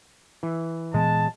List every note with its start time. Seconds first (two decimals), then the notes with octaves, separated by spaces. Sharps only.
0.43 E3
0.94 A#2 E3 G#3 B3 A5